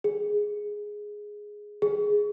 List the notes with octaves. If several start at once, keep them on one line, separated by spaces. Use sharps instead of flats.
G#4
G#4